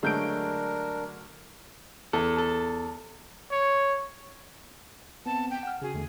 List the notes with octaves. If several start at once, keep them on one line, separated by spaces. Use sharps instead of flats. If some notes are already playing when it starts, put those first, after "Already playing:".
D3 F#3 G#3 A3 D4 A#4 G6 D7
E2 A4
A4
C#5
B3 C4 A5
G5
F#5 F6
C#3 F#4 G#4
E2 D3 A3